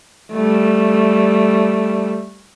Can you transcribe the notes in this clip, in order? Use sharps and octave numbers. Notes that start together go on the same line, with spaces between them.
G3 A3